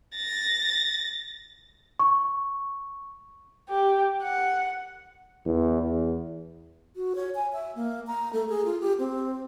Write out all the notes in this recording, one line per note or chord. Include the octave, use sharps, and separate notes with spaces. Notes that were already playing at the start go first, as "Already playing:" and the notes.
A6 A#6
C#6
G4
F#5
E2
E2
F#4
C#5
G#5
E5
A#3
A#5
A3
G#4
F4
G4
C4